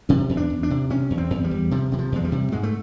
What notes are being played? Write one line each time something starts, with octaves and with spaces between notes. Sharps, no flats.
C3 C#4
E2
D4
E2
D4
C3
C3 C#4
E2
C4
E2
G3
E2
C3 F3
C3 E3
F3
E2 G#3
G3
C3
G#2 G#3
A3